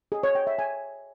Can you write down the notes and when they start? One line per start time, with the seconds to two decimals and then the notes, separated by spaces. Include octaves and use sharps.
0.12 G#4
0.23 C#5
0.35 G5
0.47 E5
0.59 G#5